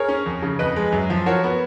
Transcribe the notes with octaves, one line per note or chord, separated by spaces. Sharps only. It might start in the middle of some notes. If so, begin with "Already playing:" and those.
Already playing: G#4 A#4 C#5
C#4
F2
C#3
F2 B4 D#5
G#3
F#2
F3
F#4 A#4 C#5
B3